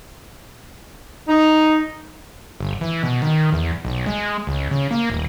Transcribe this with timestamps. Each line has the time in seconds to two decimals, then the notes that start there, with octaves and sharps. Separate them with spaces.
1.27 D#4
2.60 G1
2.81 E3
3.03 B2
3.22 D#3
3.52 E2
3.85 B1
4.06 G#3
4.47 C#2
4.71 C#3
4.91 A#3
5.10 D#1